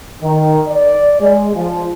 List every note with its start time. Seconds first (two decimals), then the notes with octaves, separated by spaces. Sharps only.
0.23 D#3
0.68 D5
1.21 G#3
1.55 F3